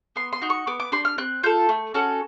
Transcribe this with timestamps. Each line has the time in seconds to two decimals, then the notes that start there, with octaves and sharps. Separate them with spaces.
0.16 B3 C6
0.33 C6
0.42 D#4 F#4
0.50 C#6
0.67 B3 D6
0.80 D6
0.92 D4 G4 C6
1.05 F6
1.18 C4 F#6
1.43 F4 A4 G6
1.69 A3
1.94 C#4 F#4 A4